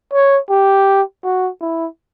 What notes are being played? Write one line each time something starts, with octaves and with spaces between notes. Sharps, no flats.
C#5
G4
F#4
E4